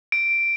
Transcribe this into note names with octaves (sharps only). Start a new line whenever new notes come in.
D7